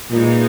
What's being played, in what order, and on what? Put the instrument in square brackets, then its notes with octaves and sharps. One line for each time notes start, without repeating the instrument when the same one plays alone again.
[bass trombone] A#2 [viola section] E3 G#3 D#4